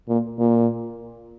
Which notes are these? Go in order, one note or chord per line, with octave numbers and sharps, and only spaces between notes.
A#2
A#2